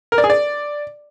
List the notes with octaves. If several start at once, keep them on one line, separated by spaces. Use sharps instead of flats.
A#4
D5
G#4
D5